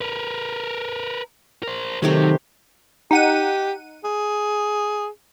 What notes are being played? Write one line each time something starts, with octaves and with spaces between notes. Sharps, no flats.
A#4 B4
A#4 C5
C3 D#3 F#3 A3 G4
D#4 G4 F#5 D#7
G#4